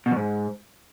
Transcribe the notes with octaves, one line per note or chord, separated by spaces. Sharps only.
B2
E2
G#2